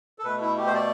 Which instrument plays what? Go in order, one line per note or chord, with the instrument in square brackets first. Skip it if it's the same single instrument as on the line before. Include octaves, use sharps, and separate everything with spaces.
[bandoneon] A4
B2 A3 B4
E4
G4
C5
D5